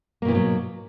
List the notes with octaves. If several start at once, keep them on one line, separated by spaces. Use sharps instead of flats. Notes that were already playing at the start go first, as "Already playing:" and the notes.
G#2 B2 E3 F#3 A#3